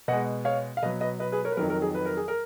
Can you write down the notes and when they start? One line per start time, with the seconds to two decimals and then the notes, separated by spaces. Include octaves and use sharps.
0.08 B2 G#3 D#5 F#5
0.45 C#5 F5
0.77 F5
0.83 B2 F#3 B4 D#5
1.01 B4 D#5
1.20 B4 D#5
1.32 G#4 B4
1.45 A#4 C#5
1.52 B4
1.57 F2 D#3 F#3 A#4
1.70 A#4
1.82 G#4
1.95 B4
2.06 A#4
2.17 G#4
2.28 A#4